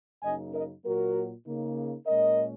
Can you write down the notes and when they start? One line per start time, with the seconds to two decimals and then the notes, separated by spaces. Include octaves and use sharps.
0.23 F#2 C#3 A#3 D#4 D#5 G#5
0.54 A#4 D#5
0.84 A#2 F#3 A#3 F#4 A#4
1.45 C#3 A#3 D#4
2.06 A#2 G#3 C#4 A#4 D#5